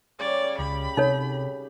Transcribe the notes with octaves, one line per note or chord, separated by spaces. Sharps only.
C#3 G3 C#5 D5
C#2 G4 B5
C3 D#4 A4 C#5